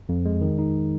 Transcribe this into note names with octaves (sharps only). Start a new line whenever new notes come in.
F2
G#3
D#3
D#4